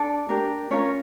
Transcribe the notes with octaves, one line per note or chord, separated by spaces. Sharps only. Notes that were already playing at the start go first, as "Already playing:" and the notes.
Already playing: D4 A4 D5
D4 G4 A#4
C#4 F4 A#4 C#5